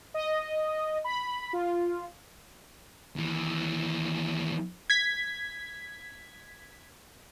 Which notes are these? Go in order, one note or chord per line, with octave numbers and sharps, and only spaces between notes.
D#5
B5
F4
D#2 E3
G#6 B6